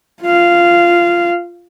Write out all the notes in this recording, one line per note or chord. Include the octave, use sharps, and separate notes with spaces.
F4 F5